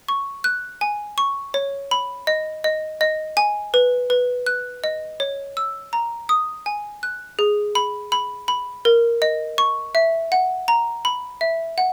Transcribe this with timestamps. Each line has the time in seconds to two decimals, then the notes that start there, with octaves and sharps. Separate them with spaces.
0.08 C#6
0.44 F#6
0.81 G#5
1.18 C#6
1.54 C#5
1.91 B5
2.27 D#5
2.64 D#5
3.01 D#5
3.37 G#5
3.74 B4
4.10 B4
4.46 F#6
4.84 D#5
5.20 C#5
5.57 E6
5.93 A#5
6.29 D#6
6.66 G#5
7.03 F#6
7.39 G#4
7.75 B5
8.12 B5
8.48 B5
8.85 A#4
9.22 D#5
9.58 C#6
9.95 E5
10.32 F#5
10.68 A#5
11.05 B5
11.41 E5
11.78 F#5